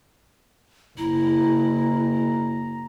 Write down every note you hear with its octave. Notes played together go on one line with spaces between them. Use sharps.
F#1 E4 A#5